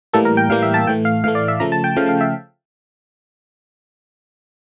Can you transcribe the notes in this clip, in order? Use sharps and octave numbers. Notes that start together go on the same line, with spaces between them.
A2 E3 G3 A#3 A4
A#4
G5
A2 E3 G3 A#3 F5
E5
A5
A2 E3 A3 G5
F5
A2 E3 A3 F5
D5
E5
C#3 F3 A3 A#5
A5
G5
C#3 F3 A3 F5
F5
E5